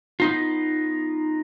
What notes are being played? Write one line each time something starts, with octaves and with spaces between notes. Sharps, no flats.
B3 D#4 F4